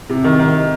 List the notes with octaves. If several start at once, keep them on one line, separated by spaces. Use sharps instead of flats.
C3
D#3
D#3